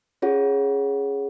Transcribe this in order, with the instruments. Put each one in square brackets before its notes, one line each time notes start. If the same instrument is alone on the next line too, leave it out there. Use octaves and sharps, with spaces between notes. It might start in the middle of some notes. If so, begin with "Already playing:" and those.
[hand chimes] C#4 F4 G#4 C#5 F#5